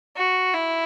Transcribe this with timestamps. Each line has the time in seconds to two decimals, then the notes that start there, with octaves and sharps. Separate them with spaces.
0.17 F#4
0.54 E4